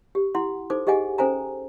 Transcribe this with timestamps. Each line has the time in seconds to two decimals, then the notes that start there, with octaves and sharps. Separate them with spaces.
0.15 G4
0.35 E4 F#5 C6
0.70 D#4 A4 C5 D6
0.87 G4 G#4 D#5 F#5 G#5
1.18 C#4 A4 C5 G#5 A#5